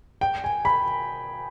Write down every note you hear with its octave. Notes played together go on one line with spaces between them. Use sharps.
G5
G#5
B5